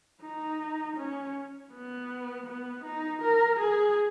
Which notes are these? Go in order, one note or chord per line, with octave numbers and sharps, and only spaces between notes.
D#4
C#4
B3
B3
D#4
A#4
G#4